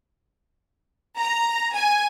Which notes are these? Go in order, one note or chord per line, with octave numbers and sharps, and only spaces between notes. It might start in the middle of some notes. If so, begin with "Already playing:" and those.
A#5
G#5